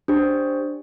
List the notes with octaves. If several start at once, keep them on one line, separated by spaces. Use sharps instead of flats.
D4 G4 C5